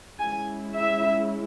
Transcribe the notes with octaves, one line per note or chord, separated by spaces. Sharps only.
G#3 C#4 E4 G#5
E5